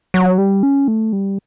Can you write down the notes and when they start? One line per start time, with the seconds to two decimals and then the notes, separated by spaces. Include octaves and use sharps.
0.14 F#3
0.38 G3
0.63 C#4
0.87 A3
1.13 G3